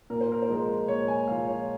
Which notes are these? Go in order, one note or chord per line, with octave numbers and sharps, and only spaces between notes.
A#2 A#4
C5
A#4
C5
F3 G#3 A#4
A#2 C#5
G#5
F3 G#3 F5
C#5